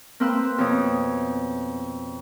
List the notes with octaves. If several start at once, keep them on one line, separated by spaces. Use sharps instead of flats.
A#3 C4 B4 C6 E6 F#6
F2 B2 C#5 D#6